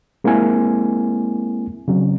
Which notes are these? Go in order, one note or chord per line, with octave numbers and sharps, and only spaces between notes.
G#3 A#3 C4 E4 G#5
C#3 F#3 C4